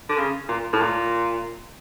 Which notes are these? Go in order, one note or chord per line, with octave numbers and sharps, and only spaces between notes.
D3
C#3
A#2
A2
A#2